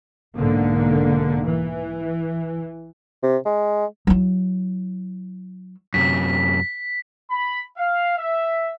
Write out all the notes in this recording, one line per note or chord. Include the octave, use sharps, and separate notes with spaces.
B1 G#2 D3 A#3
E3
C3
G#3
F#3 E4
F#2 C3 B6
B5
F5
E5